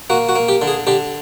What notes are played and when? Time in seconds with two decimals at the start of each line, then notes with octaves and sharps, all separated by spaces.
0.10 A#3 F#4
0.29 F#4
0.36 A#3
0.49 G4
0.62 D3
0.68 G#4
0.87 D3 G4